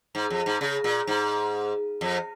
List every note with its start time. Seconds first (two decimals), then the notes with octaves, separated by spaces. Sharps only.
0.15 G#2
0.30 F2
0.46 G#2
0.61 C#3
0.84 A#2
1.07 G#2
2.01 F2